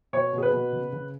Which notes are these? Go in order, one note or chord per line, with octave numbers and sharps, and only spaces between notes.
B2 C#5
B2
G#4
B4
B2
C#3
C#3